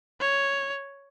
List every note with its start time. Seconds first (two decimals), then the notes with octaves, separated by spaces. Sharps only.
0.20 C#5